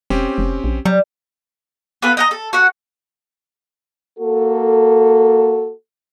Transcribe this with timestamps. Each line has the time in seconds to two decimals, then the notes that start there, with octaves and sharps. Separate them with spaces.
0.10 E1 C4 C#4 G4
0.38 F1
0.64 A#1
0.85 F#3 G3
2.02 B3 F4 A4 B4
2.17 D#5 F#5 A#5
2.31 A4
2.53 F#4 F#5
4.19 A#3 F#4 A4